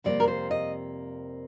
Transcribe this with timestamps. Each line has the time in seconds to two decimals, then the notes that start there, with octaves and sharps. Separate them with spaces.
0.04 F2 C3 G3 A#3 D5
0.20 A#4
0.28 C5
0.51 D#5